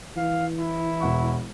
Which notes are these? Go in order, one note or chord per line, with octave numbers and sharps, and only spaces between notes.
E3 F5
E4
E1 F#5 C#6